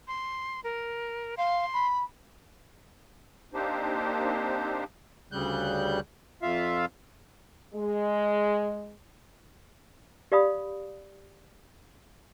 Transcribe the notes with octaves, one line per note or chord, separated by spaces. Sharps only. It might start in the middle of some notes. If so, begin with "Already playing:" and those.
C6
A#4
F5 C6
B5
A#3 C4 D4 D#4 G4 C5
D2 C#3 G3 F#6 G6
F2 F4 E5 F5
G#3
G4 D5 F5 B5 D#6